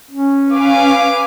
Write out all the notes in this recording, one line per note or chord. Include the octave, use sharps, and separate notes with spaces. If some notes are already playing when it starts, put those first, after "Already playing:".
C#4
B4 F5 G#5 D6